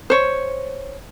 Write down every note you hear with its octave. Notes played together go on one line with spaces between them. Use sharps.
C5 C#5